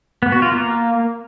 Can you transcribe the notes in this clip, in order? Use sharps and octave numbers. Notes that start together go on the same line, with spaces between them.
B3
F#4
F4
A#3